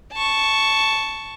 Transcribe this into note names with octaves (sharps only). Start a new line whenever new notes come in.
A5 C#6